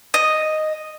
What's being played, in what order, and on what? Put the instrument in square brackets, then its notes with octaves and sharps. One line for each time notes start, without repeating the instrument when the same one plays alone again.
[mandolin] D#5